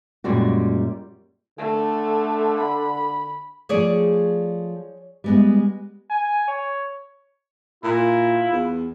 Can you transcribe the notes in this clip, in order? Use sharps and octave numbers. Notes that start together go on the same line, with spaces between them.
F#2 A#2 G3 G#3 F#4
D3 A3
B5
F3 A3 G#4 C#5 D5
G3 G#3 B3
G#5
C#5
A#2 E4 F4
E2